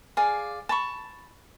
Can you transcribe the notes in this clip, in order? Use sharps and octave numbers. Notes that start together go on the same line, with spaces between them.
G#4 D5 F5
A5 B5 C#6